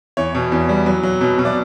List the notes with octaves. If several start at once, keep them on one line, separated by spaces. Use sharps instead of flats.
E2 C#5
B2
E2
G3
F#3
F#3
B2
B2
D5